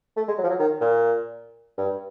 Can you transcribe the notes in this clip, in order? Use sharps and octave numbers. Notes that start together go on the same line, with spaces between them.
A3
G#3
F#3
F3
F#3
D#3
A#2
G2